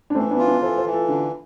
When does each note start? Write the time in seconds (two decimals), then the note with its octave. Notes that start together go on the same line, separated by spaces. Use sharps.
0.10 D4
0.15 E3 A3 C4
0.31 B3 D4
0.38 F4
0.46 B3 D4
0.62 E3 A4 C5
0.77 A4 C5
0.85 E3
0.93 F4 A4
1.08 D3 D4 F4